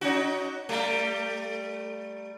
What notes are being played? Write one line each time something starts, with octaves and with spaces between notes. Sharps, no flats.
C#4 D#4 F#4
G3 A3